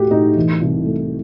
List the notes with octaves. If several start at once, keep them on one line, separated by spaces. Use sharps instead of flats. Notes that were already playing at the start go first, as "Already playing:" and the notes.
Already playing: A2 A3 F#4 G4
A2 D#4
E3
C2
A3